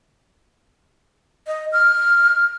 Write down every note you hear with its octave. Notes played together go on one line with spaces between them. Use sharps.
D#5
F6